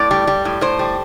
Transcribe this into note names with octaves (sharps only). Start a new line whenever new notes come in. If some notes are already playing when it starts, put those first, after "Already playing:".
Already playing: A2 D5
G3
G3
A2
A2 C5
G3